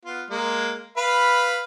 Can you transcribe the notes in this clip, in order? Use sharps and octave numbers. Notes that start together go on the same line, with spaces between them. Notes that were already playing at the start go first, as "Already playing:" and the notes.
B3 F4
G#3 A#3
B4 F5 B5